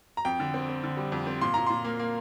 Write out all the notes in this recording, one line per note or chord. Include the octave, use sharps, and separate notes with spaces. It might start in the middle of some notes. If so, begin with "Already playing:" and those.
A#5
F2 G5
D3
C4
C4
D3
G3
F2
C4
A#2 C6
A#2 A#5
A#2 C6
A#3
A#3